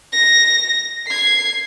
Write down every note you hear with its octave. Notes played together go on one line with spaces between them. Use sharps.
A#6
G#6 C7